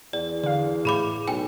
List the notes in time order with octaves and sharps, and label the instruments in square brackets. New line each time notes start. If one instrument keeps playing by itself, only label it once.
[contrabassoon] E2 [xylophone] D5
[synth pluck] D3 F5 [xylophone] D5
[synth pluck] A2 [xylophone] G#4 B5 D6
[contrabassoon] B1 [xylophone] G5 G#5